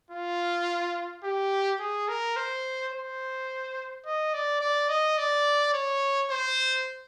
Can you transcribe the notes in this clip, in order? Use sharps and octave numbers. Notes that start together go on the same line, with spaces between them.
F4
G4
G#4
A#4
C5
C5
D#5
D5
D5
D#5
D5
C#5
C5